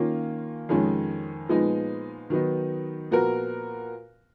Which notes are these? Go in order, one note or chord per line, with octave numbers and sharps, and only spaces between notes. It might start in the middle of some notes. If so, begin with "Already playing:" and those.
Already playing: D#3 A#3 C#4 F4
F2 D#3 G#3 C#4
A#2 F3 G#3 B3 D#4
D#3 F#3 B3 D#4
A#2 F3 B3 F#4 A#4